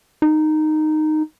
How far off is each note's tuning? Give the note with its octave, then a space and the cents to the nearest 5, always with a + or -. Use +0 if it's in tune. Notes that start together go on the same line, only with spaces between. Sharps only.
D#4 -10